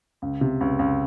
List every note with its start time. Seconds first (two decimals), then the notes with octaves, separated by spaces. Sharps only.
0.22 C#2
0.41 C3
0.61 C#2
0.79 C#2